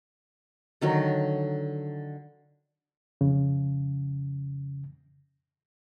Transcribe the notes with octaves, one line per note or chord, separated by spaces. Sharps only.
D3 D#3 F#3
F2 C#3